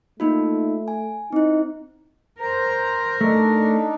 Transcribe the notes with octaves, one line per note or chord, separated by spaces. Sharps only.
A3 A#3 D#4 F4
G#5
C4 D#4 E4
A#4 C5 A#5
A3 D4 D#4